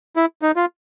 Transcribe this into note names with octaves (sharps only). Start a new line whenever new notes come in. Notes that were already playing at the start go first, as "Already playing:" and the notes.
E4
D#4
F4